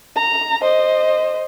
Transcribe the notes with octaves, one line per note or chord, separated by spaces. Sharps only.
A#5
C5 D#5